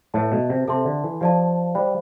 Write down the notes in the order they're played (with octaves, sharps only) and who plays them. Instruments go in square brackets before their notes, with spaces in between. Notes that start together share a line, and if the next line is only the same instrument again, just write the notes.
[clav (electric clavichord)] A2 [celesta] B4 E5 A5
[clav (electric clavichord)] B2
C3
[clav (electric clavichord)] C3 [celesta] A4 E5 A5 C6
[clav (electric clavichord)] D3
E3
[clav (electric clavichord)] F3 [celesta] G4 D5 F5 A5
[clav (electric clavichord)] G3 [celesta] C5 F5 B5